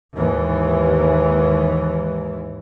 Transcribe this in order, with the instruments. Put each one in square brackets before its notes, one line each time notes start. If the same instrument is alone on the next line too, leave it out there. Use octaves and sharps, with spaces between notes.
[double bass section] D#2 G#2 E3